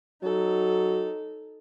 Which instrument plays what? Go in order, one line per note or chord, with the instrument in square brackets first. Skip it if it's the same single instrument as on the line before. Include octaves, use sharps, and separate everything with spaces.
[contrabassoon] F#3 [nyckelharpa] D#4 A4